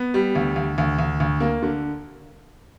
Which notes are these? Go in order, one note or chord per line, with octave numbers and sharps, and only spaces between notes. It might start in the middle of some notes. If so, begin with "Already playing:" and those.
Already playing: B3
G3
D2
D2
D2
D2
D2
A#3
D3